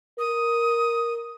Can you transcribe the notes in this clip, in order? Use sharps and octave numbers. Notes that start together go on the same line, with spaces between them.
A#4 D#6